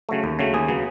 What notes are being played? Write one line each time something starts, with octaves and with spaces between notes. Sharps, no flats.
C#3 F#3 A3
D#2
C#3 F#3 A3
D#2 G#4
C#3 F#3 B3